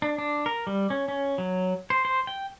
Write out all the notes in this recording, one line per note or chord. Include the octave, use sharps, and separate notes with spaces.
D4
D4
A#4
G3
C#4
C#4
F#3
C5
C5
G5